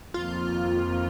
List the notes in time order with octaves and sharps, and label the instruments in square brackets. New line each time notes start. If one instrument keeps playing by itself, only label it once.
[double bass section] F2 D#3 A#3 [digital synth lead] F4